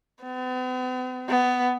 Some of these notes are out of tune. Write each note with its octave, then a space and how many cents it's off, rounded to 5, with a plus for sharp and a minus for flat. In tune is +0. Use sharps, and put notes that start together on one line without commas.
B3 +45
B3 +15